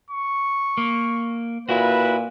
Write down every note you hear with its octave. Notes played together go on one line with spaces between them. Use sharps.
C#6
A#3
A#2 E4 F#4 B4